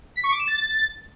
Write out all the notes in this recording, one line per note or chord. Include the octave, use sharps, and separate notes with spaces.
B6
C#6
D6
E7
A6